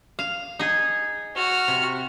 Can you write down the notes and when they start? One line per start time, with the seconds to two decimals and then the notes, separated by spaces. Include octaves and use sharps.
0.19 F5
0.59 D#4 G#4
1.35 F#4 F6
1.68 C3